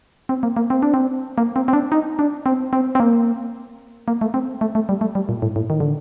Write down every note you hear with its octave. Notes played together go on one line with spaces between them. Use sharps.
C4
A#3
A#3
C4
D4
C4
A#3
C4
C4
D4
D#4
D4
C4
C4
C4
A#3
A#3
A3
C4
A3
A3
G3
A3
G3
A#2
A2
A2
D#3
D3